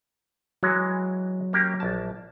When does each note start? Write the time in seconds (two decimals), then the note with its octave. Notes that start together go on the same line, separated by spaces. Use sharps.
0.63 E3 F#3 G#3 F#4
1.53 A#3 C#4 G4
1.80 A#1 A5